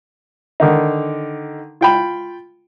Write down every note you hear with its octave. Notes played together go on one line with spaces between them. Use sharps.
D3 D#3 D#4
F4 G5 B5